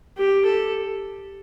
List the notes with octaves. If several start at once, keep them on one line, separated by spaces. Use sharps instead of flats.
G4
A4